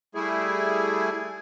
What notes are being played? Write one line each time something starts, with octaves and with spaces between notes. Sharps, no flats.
G3 A3 E4 G#4